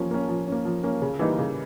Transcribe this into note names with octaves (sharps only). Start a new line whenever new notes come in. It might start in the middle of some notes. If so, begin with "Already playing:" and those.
Already playing: F3 A#3 C#4
A#3 C#4
F3
A#3 C#4
F3
A#3 C#4
C#3
E3 G3 A#3 D#4
C#3